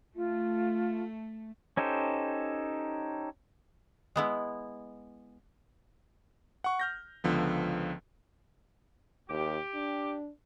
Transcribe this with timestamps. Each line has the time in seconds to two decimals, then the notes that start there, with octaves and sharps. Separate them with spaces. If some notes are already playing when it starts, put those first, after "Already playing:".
0.15 A3 F4
1.77 C#4 D#4 G4 A4 C5
4.16 G#3 B3 E4
6.64 F#5 C#6
6.80 F6 G6 A#6
7.24 C#2 D3 F3 B3
9.30 D#2 G4
9.75 D4